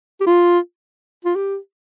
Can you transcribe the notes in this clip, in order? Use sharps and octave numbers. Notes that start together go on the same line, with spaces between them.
G4
F4
F4
G4